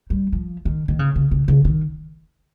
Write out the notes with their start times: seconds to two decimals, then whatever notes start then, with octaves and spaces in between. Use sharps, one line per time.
0.10 G3
0.32 F3
0.65 D#3
0.88 D#3
0.99 C#3
1.16 C#3
1.31 C#3
1.48 C#3
1.65 D#3